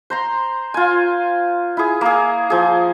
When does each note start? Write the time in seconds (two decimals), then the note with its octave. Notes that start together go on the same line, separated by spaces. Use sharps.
0.10 C5 A#5 C6
0.74 F4 G#5
1.77 E4 G#4
2.01 A#3 G#4
2.50 F3 G#4